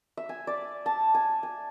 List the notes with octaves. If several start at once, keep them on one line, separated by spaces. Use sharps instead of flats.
E5
G#5
D5
A5
G#5
G#5